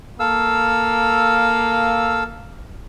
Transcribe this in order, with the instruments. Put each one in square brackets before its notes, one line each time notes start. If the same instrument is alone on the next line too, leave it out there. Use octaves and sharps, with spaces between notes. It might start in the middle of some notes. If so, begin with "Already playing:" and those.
[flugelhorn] A#3 [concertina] A4 F5 E6